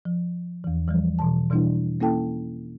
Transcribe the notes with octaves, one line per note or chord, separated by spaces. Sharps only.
F3
E2 E3
E3 F3 G3
B2 E3 A5
B2 E3 G3 D4 E4
A#3 C#4 E4 A4 G5 A5